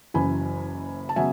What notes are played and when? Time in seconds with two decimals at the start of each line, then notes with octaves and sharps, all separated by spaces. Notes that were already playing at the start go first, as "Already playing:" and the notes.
0.14 F#1 F#2 E3 G#5 B5
1.09 A5
1.16 C#3 F#3 B3 E5 G#5